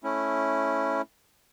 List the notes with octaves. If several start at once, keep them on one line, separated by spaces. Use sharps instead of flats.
A3 C#4 E4